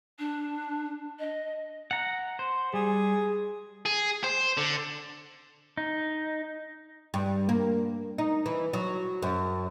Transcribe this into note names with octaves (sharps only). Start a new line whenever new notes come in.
D4
D#5
F#5 A#5
C5
G3 G#4
G#4
C5
D3
D#4
G2
A#3
D#4
E3
F#3
F#2